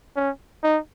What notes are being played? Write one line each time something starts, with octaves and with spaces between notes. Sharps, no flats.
C#4
D#4